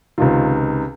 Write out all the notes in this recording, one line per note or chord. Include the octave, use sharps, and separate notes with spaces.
C#2 C3 D#3 F4